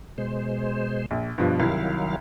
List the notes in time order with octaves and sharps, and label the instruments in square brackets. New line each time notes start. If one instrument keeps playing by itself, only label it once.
[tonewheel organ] B2 G#3 C5
[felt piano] A#1
[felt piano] G2 B2 F3 [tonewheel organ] D4
[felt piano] C2 E4 [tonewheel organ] D#3 F#3 F5